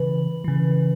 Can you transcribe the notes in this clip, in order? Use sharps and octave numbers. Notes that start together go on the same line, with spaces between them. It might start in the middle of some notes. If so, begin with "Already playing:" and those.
Already playing: C#3 E3 B4
C#3 E3